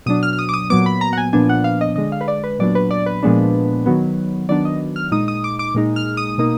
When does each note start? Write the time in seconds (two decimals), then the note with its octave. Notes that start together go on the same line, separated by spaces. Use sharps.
0.06 B2 F#3 D4 D#6
0.23 F6
0.33 F6
0.39 D#6
0.49 D6
0.54 D#6
0.70 A#2 F#3 B3 D6
0.86 B5
1.01 A#5
1.13 F#5
1.18 G#5
1.33 A#2 F3 B3 D4 G#5
1.49 F#5
1.64 F5
1.81 D#5
1.96 D3 G#3 D4 D#5
2.12 F5
2.21 B4
2.28 D5
2.44 B4
2.59 A#2 F#3 B3 D4 D5
2.75 B4
2.91 D5
3.06 B4
3.23 A#2 F3 G#3 B3 D4
3.86 D#3 F#3 B3
4.49 D#3 F#3 B3 D4 D5
4.65 D#5
4.96 F6
5.11 A#2 G#3 D#4 D#6
5.28 D#6
5.44 D6
5.59 D6
5.75 A#2 G#3 D#4
5.96 F6
6.17 D#6
6.38 B2 A#3 D#4